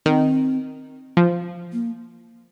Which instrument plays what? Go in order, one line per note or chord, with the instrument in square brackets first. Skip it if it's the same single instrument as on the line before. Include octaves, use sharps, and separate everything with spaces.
[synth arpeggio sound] D#3 [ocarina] C4
[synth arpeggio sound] F3
[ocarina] A#3